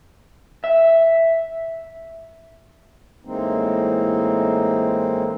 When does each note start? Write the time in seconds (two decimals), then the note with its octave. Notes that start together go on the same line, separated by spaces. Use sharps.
0.64 E5
3.25 A2 E3 G#3 A#3 C4 D#4